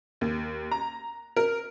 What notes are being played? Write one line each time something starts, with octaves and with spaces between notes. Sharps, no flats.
D#2
A#5
A#4